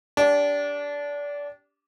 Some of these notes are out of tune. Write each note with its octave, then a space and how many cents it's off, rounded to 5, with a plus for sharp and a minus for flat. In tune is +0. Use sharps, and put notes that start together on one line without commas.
D4 -25 G4 +0